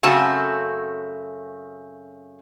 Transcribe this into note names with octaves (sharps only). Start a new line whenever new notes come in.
F#2 C#3 A3 C4 F#4 A5